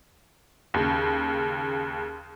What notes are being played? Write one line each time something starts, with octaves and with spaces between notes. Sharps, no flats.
D#2 C#3